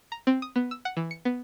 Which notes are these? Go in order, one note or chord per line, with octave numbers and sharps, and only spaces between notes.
A#5
C4
D#6
B3
E6
F#5
E3
C#7
B3